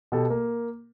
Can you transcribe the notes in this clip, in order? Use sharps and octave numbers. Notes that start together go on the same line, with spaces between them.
B2 G4 A4
A#3